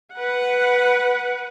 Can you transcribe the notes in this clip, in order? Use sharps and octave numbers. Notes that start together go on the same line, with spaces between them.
B4 F#5